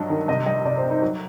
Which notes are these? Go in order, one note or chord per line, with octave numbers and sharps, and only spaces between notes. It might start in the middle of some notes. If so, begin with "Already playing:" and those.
Already playing: G2 F#3 D#5
D#3
C3 D#5
G3 D#5
C3 D5
C5
C4
D#4
F#3